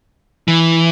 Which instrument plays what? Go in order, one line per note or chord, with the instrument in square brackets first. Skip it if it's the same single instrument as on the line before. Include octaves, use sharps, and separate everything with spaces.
[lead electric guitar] E3